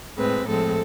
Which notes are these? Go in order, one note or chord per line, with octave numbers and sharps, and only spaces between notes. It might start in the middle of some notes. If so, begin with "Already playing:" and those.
A2 G#3 C4 B4
A2 F3 G#3 C4 A4